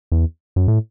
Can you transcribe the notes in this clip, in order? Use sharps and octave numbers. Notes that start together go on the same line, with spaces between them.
E2
F#2
A2